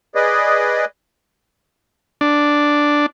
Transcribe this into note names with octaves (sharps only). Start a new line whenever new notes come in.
G#4 B4 D5 D#5
D4